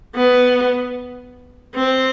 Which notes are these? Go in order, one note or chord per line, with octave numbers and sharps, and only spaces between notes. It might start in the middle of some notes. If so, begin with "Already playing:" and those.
B3
C4